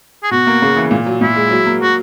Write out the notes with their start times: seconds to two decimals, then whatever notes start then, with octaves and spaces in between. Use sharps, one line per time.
0.23 G#4
0.31 B2 F#4
0.47 A#3
0.62 C#3
0.77 E3
0.91 A#2
1.06 F#3
1.21 A#2 E4
1.36 G#3
1.51 F#3
1.66 A#3
1.81 F#3 F#4